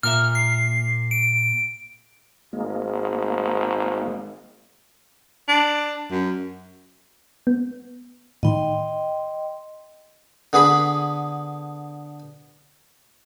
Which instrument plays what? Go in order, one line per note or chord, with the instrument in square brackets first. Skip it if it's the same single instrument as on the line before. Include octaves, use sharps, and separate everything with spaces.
[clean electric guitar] A#2 A#4 E5 [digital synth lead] F6
[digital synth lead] C7
D7
[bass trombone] G#1 [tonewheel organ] G#3 A#3
[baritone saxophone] D4
F#2
[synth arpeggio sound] B3
[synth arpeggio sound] A2 D#3 [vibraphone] D#5 G5 C6
[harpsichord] D3 B3 G#4 B5